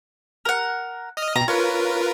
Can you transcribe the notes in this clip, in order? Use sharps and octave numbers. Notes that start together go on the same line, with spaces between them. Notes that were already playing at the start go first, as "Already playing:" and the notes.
A#4 F#5
D#5 D#6 F6
B2 A#5
C#4 F4 A#4 B4